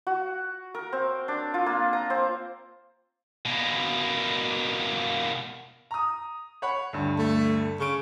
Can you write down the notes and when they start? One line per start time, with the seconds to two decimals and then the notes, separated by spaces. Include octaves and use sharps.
0.07 F#4
0.74 A#4
0.93 C4
1.28 D4
1.54 F4
1.66 A#3
1.93 A#5
2.10 C4
3.46 B2 A#3
5.91 A#5 D#6
6.62 C#5 F#5 B5
6.93 D2 G2
7.19 A3
7.80 C#3 C#6 D7